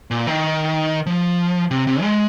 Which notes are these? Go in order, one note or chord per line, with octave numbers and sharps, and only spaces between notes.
A#2
D#3
F3
C3
C3
G#3